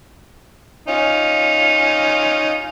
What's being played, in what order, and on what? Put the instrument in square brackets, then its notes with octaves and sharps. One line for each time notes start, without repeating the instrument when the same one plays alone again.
[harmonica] C#4 D#4 F4